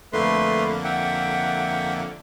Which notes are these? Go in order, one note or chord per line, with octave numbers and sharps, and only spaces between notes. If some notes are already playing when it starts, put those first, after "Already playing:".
F2 D3 A3 A#3 B4 C6
E5 F#5 G5